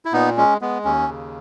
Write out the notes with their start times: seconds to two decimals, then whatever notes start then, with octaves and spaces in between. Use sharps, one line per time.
0.05 E4
0.13 A#2 B3 D#4
0.37 G#3 C#4
0.61 G#3 B3
0.85 D#2 C#4
1.09 C#3